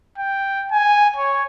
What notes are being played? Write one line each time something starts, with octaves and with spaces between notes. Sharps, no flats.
G5
G#5
C#5